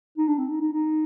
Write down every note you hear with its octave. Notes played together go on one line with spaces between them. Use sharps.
D#4
D4
C4
D#4
D#4
D#4